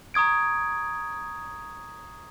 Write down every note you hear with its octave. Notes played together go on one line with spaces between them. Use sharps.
A#5 C#6 D#6 G#6 D7